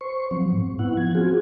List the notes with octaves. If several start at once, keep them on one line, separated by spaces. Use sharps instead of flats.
C5 C#6
F3 F#3 C4
G#2
B3 E4 F#5
F3 G#6
C4 F4 F#4 G#4